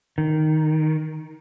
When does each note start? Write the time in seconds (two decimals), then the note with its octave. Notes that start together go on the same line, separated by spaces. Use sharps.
0.18 D#3